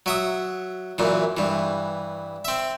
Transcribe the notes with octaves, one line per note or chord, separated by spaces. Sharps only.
F#3 E5 D#6
F#2 A#2 E3
G2 E3
C4 E5